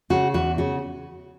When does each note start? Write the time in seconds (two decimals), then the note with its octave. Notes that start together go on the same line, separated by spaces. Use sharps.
0.10 C#3 F#4
0.34 E2 F#4
0.58 C#3 F#4